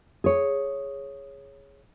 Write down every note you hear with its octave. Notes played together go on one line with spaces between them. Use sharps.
G#4 C#5